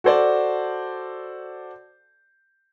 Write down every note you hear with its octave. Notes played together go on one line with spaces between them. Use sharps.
F#4 A4 C5 D5